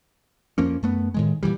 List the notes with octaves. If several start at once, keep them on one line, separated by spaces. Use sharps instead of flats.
F2 F3 A#3 C#4
F#2 A3 B3
A2 D#3 G#3
A#2 C#3 E3 G3